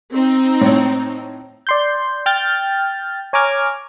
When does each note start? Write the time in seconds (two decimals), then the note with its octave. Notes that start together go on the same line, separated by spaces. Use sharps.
0.12 C4 D#4
0.61 A2 C#5
1.67 D5 C6 G6
2.26 G5 F6 G6 A6
3.33 C#5 G#5 A#5 D6 F6 G#6